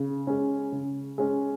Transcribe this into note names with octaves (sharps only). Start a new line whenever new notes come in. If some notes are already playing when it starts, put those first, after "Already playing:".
Already playing: C#3
G#3 C#4
C#3
G#3 C#4